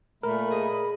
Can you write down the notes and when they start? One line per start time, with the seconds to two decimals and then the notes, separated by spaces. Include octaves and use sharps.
0.23 A#2 A3 A#4 B5
0.51 G#4 D#5